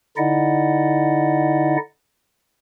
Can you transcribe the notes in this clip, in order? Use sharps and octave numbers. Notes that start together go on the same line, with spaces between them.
D3 D#4 E4 D5 D#5 F#5